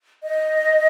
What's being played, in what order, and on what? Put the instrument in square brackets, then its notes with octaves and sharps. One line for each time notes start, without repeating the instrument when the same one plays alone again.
[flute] D#5